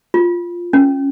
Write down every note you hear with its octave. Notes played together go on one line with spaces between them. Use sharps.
F4
C#4